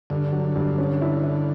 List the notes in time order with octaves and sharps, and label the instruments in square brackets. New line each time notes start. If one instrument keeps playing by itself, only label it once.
[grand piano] G2 [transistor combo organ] D3
[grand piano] F#3
G2
C#4
E4
E4